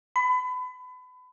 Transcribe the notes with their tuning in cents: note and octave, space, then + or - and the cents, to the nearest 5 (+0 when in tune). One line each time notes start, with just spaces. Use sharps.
B5 +30